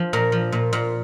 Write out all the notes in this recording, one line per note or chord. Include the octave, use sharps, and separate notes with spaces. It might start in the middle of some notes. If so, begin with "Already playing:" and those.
Already playing: F3
A#2 A#4
F3
A#2
A#2